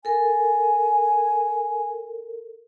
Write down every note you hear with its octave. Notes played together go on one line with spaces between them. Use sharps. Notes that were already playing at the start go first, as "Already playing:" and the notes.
A4 A#4 G#5